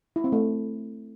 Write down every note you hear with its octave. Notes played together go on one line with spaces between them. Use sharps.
E4
C4
A3